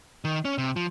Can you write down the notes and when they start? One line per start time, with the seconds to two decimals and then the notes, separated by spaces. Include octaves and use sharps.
0.25 D#3
0.45 C#4
0.58 C3
0.76 F3